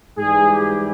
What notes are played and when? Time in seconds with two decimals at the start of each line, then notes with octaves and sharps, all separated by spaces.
0.18 G#2 E3 G3 G#4
0.52 G4